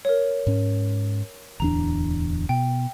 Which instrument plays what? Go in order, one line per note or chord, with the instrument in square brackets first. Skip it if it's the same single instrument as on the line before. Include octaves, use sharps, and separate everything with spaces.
[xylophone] A#4 C#5
[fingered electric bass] G#2 C#4
[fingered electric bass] D1 E2 D4 [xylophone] A#5
[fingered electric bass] B2 [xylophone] G5